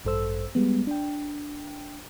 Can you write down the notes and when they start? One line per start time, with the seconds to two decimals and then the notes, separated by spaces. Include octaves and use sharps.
0.05 A1 G2 A4 C5 E6
0.55 G3 G#3 B3
0.87 D4 G5